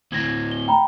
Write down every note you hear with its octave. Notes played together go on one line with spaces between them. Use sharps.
D2 A2 G#6 A#6
G7
G5 A#5 B5